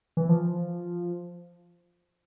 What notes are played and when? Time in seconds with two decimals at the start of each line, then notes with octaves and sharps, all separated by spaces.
0.17 E3
0.29 F3